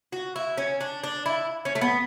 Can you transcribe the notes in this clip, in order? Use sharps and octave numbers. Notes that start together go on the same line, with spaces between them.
F#4
E4
C#4
D4
D4
E4
C#4
A3
B3